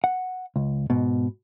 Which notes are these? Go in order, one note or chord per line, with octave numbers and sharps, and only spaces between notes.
F#5
C#2
G#2 B2